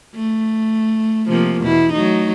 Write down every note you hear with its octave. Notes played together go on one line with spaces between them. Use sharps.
A3
C3 F3 A#3
E2 B2 E4
F#3 A3 D#4